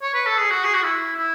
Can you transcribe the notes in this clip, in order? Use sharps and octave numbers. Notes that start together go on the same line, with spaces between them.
C#5
B4
A4
G#4
F#4
G#4
F#4
E4
E4